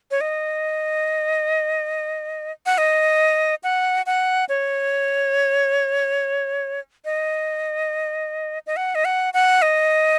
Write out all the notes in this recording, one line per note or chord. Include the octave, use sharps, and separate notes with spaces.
C#5
D#5
F#5
D#5
F#5
F#5
C#5
D#5
D#5
F#5
D#5
F#5
F#5
D#5